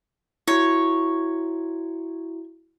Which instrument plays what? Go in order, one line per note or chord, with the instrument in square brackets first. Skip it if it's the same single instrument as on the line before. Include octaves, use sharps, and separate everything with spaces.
[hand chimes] E4 F#4 [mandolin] C#5